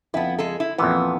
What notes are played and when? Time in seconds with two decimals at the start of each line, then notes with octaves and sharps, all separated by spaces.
0.14 F2 B3 E4
0.39 G#3 G#4 A4
0.60 E4
0.78 F2 A#2 E3 B3